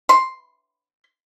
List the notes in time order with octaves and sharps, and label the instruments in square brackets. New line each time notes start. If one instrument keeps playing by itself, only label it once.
[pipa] C6